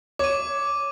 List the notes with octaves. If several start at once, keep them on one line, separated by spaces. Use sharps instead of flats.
C#5 D6 D#7